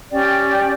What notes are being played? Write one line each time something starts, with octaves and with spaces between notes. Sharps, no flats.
C#4 G4 D5 G5